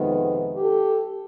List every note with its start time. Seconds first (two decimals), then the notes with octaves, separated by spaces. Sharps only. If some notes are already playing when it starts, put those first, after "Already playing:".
Already playing: F2 C3 D#3 G#3 B3
0.56 G4 A4